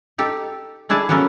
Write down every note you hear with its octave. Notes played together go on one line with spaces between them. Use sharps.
D#4 G4 A4
A3 D4 E4 G#4 A5
F#3 A#3 B3 C#4 A4 A#4